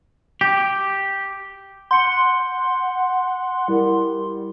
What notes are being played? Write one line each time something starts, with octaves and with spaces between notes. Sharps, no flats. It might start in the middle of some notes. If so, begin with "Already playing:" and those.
G4
F#5 C6 G6 C#7 G7
G3 E4 A#4